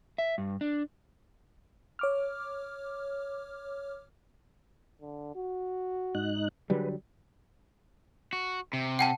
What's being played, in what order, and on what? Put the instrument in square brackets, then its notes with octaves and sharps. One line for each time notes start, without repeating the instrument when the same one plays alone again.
[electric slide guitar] E5
G2
D4
[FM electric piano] C#5 D6 F6
[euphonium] D3
F#4
[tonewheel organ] G#2 D#4 F#6
[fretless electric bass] D3 F#3 G3 [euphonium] G#4 [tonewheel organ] B4
[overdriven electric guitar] F#4
C3
[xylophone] F#5 G5 A5